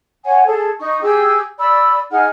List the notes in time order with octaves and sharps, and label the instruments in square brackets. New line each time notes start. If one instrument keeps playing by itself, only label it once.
[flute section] C#5 F#5 G#5
G#4 A4
D#4 C#6
G4 G#4 E6
D5 B5 E6
D#4 G#4 F#5 F6